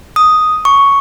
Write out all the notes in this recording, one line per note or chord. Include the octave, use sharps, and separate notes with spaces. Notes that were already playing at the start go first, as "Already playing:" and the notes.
D#6
C#6